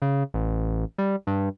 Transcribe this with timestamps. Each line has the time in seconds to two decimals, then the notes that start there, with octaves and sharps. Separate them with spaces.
0.02 C#3
0.34 A1
0.98 G3
1.27 G2